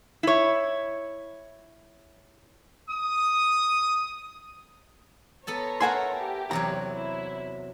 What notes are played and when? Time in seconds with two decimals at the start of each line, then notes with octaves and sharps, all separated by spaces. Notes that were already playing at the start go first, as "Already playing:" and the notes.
0.23 E4 C#5
2.89 D#6
5.47 B3 A4 C#5 A5 A#5
5.80 E4 A4 A#4 F#5 G#5 C6
6.17 G4
6.51 E2 C3 F#3 A#5
6.93 E4